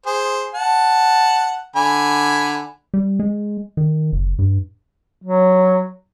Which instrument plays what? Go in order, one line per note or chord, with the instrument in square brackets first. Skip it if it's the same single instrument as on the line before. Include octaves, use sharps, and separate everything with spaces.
[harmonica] G#4 C5
F#5 A5
D3 G#5 B5
[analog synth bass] G3
G#3
D#3
F#1
G2
[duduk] F#3